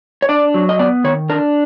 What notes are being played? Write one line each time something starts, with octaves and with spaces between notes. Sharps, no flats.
C#5
D4 D5
F#3
D#5
B3 D5
D#3 C#5
D4 A#4